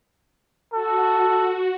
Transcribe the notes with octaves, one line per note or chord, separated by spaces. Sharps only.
F#4 A4